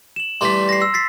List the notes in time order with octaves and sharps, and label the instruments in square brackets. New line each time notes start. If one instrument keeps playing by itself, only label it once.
[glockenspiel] E7 F#7
[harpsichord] E3 G3 A3 [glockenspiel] C6 B6
[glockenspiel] A#6 C7
E6 C7
A6 B6 C7